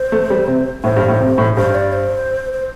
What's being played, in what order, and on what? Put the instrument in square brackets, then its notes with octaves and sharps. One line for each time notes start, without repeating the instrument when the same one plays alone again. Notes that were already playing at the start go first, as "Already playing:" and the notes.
Already playing: [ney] C5
[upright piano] A3
G3
C3
[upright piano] A2 [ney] C5
[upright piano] G2
A2
C3
A2
[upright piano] G2 [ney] C5
[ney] D5
C5
C5